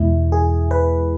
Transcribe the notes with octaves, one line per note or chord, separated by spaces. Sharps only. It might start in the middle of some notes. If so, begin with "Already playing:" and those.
Already playing: E2 B2 G#3 E4
G#4
B4